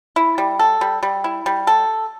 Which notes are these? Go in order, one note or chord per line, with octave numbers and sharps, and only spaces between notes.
E4
G3
A4
G3
G3
E4
G3
A4